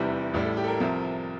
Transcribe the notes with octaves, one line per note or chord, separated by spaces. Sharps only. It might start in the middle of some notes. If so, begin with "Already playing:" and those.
Already playing: F1 E2 C3 E3 G3 E5
A1 A2 G3
A4
G4
A4
A#4
C2 C3 F3